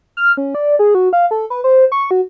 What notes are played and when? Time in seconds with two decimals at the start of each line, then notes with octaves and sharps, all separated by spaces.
0.17 F6
0.37 C#4
0.55 D5
0.79 G#4
0.95 F#4
1.13 F5
1.31 A4
1.50 B4
1.64 C5
1.92 C#6
2.11 F#4